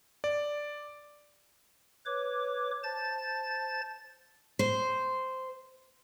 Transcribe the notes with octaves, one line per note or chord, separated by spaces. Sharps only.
D5
B4 C#5 D6
C5 A5 A6
C5